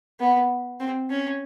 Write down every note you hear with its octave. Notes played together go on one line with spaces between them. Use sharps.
B3
C4
C#4